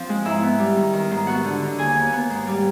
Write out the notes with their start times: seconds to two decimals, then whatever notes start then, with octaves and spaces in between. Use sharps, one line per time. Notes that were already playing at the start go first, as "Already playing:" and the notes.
Already playing: F3 C4 F4
0.09 G#3
0.25 G#2 E4 E5
0.42 B3
0.59 G3
0.77 D#3
0.93 D#3
1.11 G#2
1.27 B3 F#4 F#5
1.44 D3
1.62 D3
1.78 D#2 G#4 G#5
1.96 D#2
2.13 B3
2.30 G#2
2.47 G3